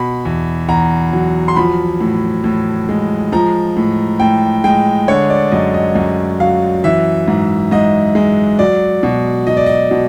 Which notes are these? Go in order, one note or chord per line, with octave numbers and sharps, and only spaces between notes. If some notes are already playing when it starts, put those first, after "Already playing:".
Already playing: B2 B5
E2
E2 A#5
F#3
C6
F3 B5
A2
A2
G#3
F3 A#5
A2
A2 G5
G#3 G5
D3 C#5
D5
F#2 D#5
D#5
F#2
F#3 F5
E3 E5
G#2
G#2 D#5
G#3
F#3 D5
B2
F#3 D#5
D5
D#5
B2